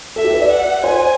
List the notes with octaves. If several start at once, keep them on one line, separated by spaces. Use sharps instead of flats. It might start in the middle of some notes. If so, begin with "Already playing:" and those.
A4 E5
G4
B4
D5
F#5
C5 G#5